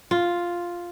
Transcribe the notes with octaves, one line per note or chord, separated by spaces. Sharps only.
F4